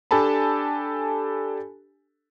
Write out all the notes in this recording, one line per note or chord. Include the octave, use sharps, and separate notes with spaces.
D4 G4 A4 G#5 A5 B5